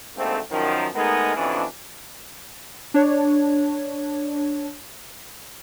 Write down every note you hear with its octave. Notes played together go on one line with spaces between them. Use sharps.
D2 G#2 A3 A#3 C4
F#2 D#3 F3
G#3 A3 B3 D#4 G#4 A#4
F2 B2 E3 C#4 D4
D4 C#5